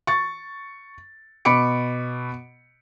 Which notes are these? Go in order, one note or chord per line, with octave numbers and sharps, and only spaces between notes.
C#6 A6
B2 B5 D6 C#7 D7